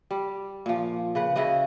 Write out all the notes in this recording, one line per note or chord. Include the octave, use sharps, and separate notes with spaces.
G3
A#2 F3
C#3 B4 F#5
C#3 E4 F#4 D#5